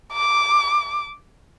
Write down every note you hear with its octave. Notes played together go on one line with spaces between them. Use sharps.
D6